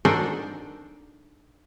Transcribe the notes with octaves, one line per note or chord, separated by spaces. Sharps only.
D4 D#4 F#4 A4 A#4 C5